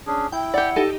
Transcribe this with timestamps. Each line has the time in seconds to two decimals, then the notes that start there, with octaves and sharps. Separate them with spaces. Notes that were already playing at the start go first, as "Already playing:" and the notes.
0.07 C#4 D4 G#4
0.32 E4 G5
0.54 G4 D5 F#5
0.76 D#4 G4 A4